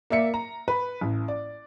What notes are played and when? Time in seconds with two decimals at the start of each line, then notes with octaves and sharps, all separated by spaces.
0.10 A#3 D5 E5 C#7
0.34 A#5
0.68 B4
1.01 A1
1.28 D5